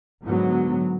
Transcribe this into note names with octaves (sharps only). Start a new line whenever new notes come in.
G#2 D3 F#3 B3